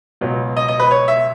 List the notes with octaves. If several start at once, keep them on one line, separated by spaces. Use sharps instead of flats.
C#2 B2 F#3
D#5
D#5
B4
C#5
E5